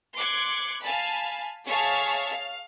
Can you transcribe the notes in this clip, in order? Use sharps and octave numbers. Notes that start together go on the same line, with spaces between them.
C6 D6 F#6 G#6 C#7
F5 G#5 A5 B5
G#4 C#5 E5 F5 A5 C#6
F5